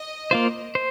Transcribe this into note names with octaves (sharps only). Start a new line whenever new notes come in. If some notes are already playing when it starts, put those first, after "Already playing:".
Already playing: D#5
A#3 F4 C5
C5